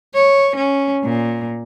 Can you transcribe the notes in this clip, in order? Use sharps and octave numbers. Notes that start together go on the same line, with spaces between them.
C#5
C#4
A#2